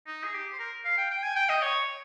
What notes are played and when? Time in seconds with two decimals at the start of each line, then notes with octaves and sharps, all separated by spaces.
0.07 D#4
0.24 G#4
0.34 G4
0.53 C5
0.59 A#4
0.85 F5
0.98 G5
1.11 G5
1.23 G#5
1.36 G5
1.49 D#5
1.62 C#5